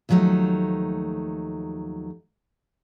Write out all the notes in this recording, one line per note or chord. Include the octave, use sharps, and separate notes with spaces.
D#2 F3 F#3 A3 D#4